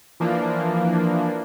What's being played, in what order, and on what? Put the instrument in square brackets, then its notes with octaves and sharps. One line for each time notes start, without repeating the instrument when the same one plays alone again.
[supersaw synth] E3 F3 A#3 D4